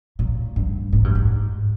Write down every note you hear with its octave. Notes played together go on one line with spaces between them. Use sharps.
A#2
G2
G#2
G2
G#2